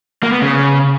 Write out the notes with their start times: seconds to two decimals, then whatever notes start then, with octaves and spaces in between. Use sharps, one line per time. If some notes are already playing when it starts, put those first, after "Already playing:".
0.23 A#3
0.32 B3
0.42 C#3